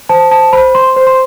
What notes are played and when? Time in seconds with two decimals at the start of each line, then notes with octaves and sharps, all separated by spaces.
0.09 C5 A5
0.31 C5 A5
0.53 C5 B5
0.75 C5 C6
0.96 C5
1.07 C6